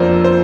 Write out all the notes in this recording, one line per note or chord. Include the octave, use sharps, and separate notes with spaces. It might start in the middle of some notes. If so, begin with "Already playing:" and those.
Already playing: F2 F3 A#3 D4 C5
C5